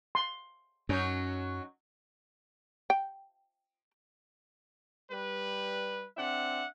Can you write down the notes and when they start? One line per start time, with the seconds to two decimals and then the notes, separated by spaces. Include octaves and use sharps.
0.15 C6
0.89 F#2 F#3 C#4 D#4
2.90 G5
5.11 G3 B4
6.17 C4 D4 E5 F#5